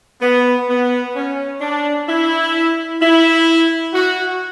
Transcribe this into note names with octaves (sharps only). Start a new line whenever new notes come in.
B3
B3
C#4
D4
E4
E4
F#4